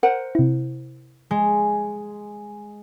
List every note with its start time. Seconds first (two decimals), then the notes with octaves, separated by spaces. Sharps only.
0.03 A#4 C5 F#5
0.35 C3 E4
1.31 G#3